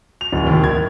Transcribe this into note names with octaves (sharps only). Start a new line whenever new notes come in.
F7
D1
D#2
G#6